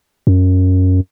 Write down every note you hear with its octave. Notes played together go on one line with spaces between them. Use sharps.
F#2